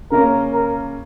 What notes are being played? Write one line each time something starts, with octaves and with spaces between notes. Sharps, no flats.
C#3 A#3 C#4 A#4
A#4